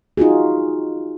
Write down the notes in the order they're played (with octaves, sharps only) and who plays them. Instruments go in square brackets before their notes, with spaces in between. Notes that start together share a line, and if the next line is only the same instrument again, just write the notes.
[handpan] D#4 F4 F#4 G#4